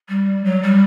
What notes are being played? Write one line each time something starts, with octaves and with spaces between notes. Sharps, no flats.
G3
F#3
G3